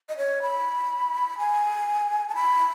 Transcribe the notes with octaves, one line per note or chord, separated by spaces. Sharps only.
D#5
C#5
B5
G#5
A5
B5